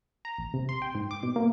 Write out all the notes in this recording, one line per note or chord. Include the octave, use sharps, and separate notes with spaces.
A#5
A1
C3
C6
G5
G#2
D6
B2
A#3